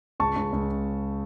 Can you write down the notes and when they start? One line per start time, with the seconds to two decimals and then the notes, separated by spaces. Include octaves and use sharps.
0.20 C#2 A5 C#6
0.36 C#2
0.53 C#2